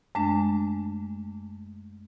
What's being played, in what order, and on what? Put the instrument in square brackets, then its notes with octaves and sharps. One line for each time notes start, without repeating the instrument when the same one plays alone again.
[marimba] F#2 G#3 A3 D4